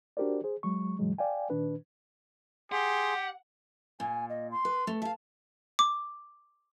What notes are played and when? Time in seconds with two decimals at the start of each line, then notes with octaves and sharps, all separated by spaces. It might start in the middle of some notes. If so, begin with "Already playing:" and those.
0.17 D4 F#4 G4 A#4 C5 D5
0.44 G#4 C5
0.63 F#3 G#3 C#6
0.99 G2 B2 E3 F#3 G#3
1.18 D5 F5 G5 G#5
1.50 A#2 D#3 D4 B4
2.72 G4 G#4 F#5 C6
4.00 A#2 G#5
4.29 D#5
4.51 C6
4.65 B4
4.87 A3
5.02 E5 F5 A5
5.79 D6